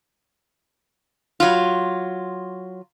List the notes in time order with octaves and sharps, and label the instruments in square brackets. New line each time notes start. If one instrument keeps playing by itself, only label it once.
[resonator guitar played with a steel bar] F#3 F4